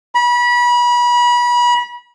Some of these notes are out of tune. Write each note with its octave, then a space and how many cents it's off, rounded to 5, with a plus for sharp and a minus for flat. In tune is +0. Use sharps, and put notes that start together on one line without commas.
B5 -30